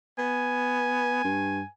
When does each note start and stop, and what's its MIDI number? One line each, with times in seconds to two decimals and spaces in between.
0.18 1.22 59
0.18 1.67 80
1.25 1.63 43